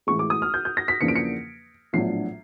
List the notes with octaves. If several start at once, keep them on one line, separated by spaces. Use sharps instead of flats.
A1 A2 E3 G#3 C#6
D6
D#6
F6
G6
G6
A#6
B6
E2 C#3 F3 A#3 D4 C#7
D7
C#7
A#1 A2 F#3 B3 D4 C7